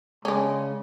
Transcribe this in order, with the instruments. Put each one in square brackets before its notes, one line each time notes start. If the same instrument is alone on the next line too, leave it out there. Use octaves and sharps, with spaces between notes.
[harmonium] C#3 [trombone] G#3 [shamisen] C#4 D4